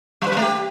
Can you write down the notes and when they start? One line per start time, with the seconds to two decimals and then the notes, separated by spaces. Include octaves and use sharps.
0.22 G3
0.27 B4
0.32 G3
0.37 A3
0.42 G4